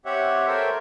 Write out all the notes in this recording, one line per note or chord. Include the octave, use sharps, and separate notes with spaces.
C4 G4 C#5 E5 F#5
A4 A#4 C5 C#5 E5 G5